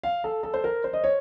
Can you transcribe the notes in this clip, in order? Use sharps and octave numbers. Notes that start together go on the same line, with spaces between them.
F5
A4
A4
C5
A#4
C5
D#5
C#5